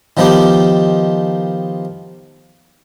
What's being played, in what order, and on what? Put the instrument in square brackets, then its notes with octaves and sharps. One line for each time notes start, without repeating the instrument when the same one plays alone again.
[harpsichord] D#3 F3 B3 D#4 G4